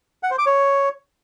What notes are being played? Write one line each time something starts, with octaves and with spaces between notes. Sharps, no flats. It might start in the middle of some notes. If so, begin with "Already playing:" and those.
F#5
C5
D6
C#5